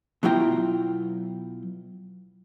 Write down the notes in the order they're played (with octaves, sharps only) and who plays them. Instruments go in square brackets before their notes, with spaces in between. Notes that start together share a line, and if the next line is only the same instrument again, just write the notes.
[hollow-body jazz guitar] B2 F#3 E4 F4 G5 A#5